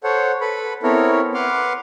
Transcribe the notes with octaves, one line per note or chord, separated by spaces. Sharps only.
A4 C5 C#5 F#5
A4 B4 B5
B3 C4 E4 A4 A#4 C#5
B4 F#5 C6 D6 F6